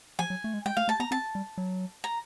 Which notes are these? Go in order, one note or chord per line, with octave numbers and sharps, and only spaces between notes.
F3 G#5
F#3
A3
G#3
G#3 G5
A3 F5
A3 A5
B3 A#5
C4 A5
G3
F#3
A#5